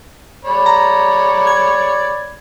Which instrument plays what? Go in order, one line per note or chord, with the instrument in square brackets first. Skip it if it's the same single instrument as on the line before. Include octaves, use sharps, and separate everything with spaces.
[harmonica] C#5 D5 B5
[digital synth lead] A#5
G#6